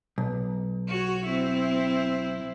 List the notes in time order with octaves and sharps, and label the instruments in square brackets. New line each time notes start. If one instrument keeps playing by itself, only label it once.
[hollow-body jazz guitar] B1
[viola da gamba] F#4 C#5
C4 E4